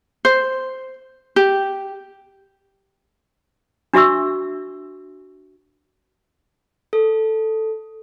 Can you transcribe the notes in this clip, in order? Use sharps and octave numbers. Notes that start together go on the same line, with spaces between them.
C5
G4
D4 F#4 E5 C#6 E6
A4